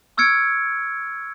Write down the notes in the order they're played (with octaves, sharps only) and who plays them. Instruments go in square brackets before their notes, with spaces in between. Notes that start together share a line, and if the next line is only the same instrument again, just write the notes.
[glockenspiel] C#6 E6 F6 G#6 C#7 D7